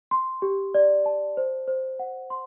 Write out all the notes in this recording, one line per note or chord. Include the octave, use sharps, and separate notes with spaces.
C6
G4
D5
A5
C5
C5
F#5
C6